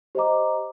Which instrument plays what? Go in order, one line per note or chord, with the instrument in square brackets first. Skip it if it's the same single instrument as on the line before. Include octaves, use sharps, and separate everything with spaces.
[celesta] G4 C5 D#5 A#5 D6